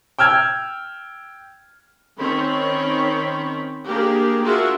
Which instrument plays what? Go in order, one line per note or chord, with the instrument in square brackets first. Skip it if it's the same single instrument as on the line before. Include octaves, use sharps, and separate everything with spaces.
[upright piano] G5 E6 F6 G#6
[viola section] D#3 C4 C#4 C#5 B5
A#3 D4 G4 G#4 A#4
D4 F4 F#4 G#4 A#4 E5